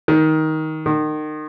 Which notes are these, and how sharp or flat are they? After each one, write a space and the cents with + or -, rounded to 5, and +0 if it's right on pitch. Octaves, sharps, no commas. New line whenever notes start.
D#3 +15
D#3 -30